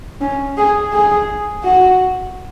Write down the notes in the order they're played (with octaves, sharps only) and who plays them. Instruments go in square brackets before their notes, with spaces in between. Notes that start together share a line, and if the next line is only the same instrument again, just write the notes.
[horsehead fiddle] C#4
G#4
G#4
F#4